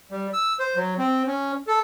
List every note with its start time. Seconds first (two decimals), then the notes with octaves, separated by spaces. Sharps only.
0.11 G3
0.33 E6
0.59 C5
0.76 F#3
0.98 C4
1.27 C#4
1.67 A4